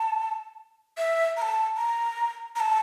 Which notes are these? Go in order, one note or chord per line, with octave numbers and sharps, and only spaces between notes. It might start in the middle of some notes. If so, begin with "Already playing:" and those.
Already playing: A5
E5
A#5
A5
A#5
A#5
A5